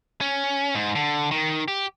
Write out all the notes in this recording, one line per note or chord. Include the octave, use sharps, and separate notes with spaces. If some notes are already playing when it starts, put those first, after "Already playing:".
C#4
G#2
D3
D#3
G4